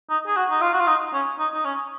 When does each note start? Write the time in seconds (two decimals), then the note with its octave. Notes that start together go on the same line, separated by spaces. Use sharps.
0.10 D#4
0.27 G#4
0.36 F#4
0.51 D#4
0.61 F4
0.73 F#4
0.80 F4
0.87 D#4
1.14 C#4
1.39 D#4
1.54 D#4
1.65 C#4